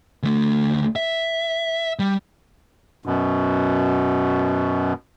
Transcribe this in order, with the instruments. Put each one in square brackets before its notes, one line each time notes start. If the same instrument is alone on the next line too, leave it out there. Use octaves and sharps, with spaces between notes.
[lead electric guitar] D2 A3
E5
G3
[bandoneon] F#2 B2